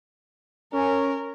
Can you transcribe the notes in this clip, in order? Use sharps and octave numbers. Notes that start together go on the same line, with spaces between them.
C#4 A#4